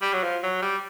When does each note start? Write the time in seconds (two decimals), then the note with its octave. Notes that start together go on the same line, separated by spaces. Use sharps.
0.02 G3
0.13 F#3
0.23 F3
0.43 F#3
0.62 G3